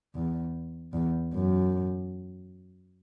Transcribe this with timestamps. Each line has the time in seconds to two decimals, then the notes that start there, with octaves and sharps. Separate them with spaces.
0.15 E2
0.93 E2
1.33 F#2